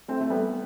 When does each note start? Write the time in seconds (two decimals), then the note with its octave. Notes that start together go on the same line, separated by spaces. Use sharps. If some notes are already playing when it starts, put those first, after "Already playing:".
0.08 A3 C4
0.21 A3
0.30 G3 B3